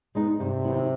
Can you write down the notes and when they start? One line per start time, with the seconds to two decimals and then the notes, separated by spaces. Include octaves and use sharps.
0.15 G#3 B3 D#4
0.40 G2 C3
0.65 D#3 F#3 B3 E4